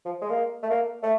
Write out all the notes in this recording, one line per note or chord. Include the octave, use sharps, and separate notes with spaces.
F3
G#3
A#3
A3
A#3
A3